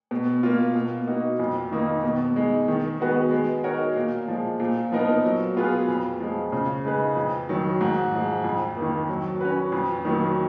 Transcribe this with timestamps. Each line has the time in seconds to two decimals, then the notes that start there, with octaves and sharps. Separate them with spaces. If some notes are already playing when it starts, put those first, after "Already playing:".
0.11 B2
0.43 A#3 F4
0.75 B2
1.07 A#3 D#4 F#4
1.40 F2
1.71 D#3 A#3 D#4
2.03 B2
2.36 G#3 D#4
2.68 D#3
3.00 G#3 B3 F#4 B4
3.31 G#3
3.63 D#4 F#4 A#4 C#5
3.96 A#2
4.28 F3 G#3
4.60 A#2
4.92 F3 B3 D#4 A#4
5.24 F#3
5.56 B3 F4 G#4 B4
5.88 F2
6.20 F3 G#3
6.52 C#3
6.84 G#3 D#4 G#4 B4
7.16 F2
7.49 D#3 F#3
7.81 G#2
8.13 F3 G#3
8.44 F2
8.77 D#3 A#3
9.09 F#3
9.41 C#4 F#4 B4
9.72 F2
10.05 D#3 F#3 A#3